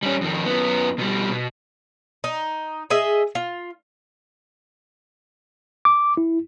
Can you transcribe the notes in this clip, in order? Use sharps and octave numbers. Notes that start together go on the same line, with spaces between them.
G3 C#4
F2 D#3
F#2 B3
B2 G3
B2
D#4
G#4 D#5 E5
F4
D6
E4